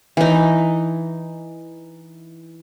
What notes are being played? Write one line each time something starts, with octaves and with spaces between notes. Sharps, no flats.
E3 D#4